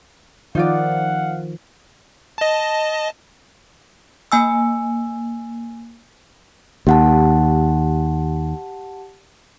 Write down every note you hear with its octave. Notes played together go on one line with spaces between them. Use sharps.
D#3 F3 D#4 F4 D5 F5 F#5
D#5 A5
A#3 G#5 E6
D#2 G4 F#5 A5